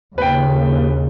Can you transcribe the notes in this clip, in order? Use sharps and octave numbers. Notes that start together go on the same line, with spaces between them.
D#2 A#2 C#3 B4 G5